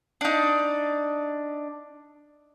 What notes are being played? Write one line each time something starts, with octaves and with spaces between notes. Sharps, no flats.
D4 D#4